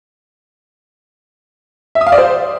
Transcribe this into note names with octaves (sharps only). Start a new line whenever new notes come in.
E5
D#6
F5
D5
C5